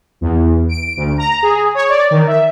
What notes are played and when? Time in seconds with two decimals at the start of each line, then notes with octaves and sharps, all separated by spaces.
0.21 E2
0.69 D7
0.96 D2
1.18 A#5
1.42 G#4
1.74 C#5
1.89 D5
2.11 D#3
2.27 E5